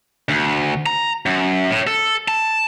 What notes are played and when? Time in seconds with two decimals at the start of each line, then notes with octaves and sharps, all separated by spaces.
0.29 D2
0.86 A#5
1.26 F#2
1.71 A2
1.87 A4
2.28 A5